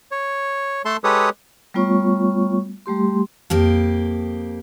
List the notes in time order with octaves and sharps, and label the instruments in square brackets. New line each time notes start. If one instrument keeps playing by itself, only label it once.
[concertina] C#5
A3 A4 A5 C6
G#3 G4 A4 B4 C#5 D#6
[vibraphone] G3 A3 B3 F4 C#5 C#6
G3 A3 G4 C6
[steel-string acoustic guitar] F2 A#3 G4